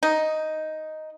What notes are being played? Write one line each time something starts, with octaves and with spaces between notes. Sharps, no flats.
D#4